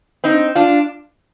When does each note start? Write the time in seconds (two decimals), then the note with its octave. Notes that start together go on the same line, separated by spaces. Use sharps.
0.24 C4 D#4
0.55 D4 F4